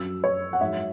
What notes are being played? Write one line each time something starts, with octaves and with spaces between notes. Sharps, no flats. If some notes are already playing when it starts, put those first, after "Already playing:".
Already playing: F#2 F#3 E6
C#5
F#5
G#2 F#3 E5